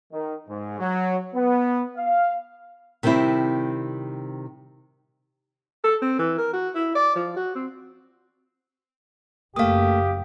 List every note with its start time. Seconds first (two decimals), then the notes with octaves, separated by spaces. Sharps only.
0.12 D#3
0.48 G#2
0.79 F#3
1.34 B3
1.97 F5
3.03 C3 D#3 G3 C4 E4
5.84 A4
6.02 C4
6.19 E3
6.38 A#4
6.53 F#4
6.75 E4
6.95 D5
7.16 F3
7.36 F#4
7.55 C4
9.56 F#1 F#2 A3 A#3 G4 F5 D#6